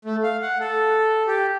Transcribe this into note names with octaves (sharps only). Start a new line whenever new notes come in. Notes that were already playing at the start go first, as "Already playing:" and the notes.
A3
F5
F#5
A4
G4